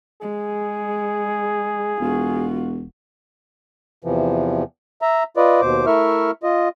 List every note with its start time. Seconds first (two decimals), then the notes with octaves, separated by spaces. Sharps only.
0.22 G#3 G#4
2.00 E1 F4 F#4
4.04 E2 C3 E3 F3
5.02 E5 A#5
5.37 F4 B4 D5 D#5
5.61 D#2 B2 C5 D6
5.86 A3 E4 A#4 E5 C#6 F6
6.43 F4 D#5